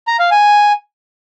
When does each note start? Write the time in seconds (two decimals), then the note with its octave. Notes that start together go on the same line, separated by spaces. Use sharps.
0.07 A#5
0.19 F5
0.31 G#5